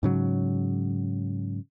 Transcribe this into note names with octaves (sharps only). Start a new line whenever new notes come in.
G#2 C#3 F#3